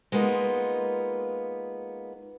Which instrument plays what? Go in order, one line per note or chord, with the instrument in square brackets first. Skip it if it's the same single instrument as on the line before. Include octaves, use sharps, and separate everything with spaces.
[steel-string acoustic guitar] G#3 A#3 B3 D#4 F4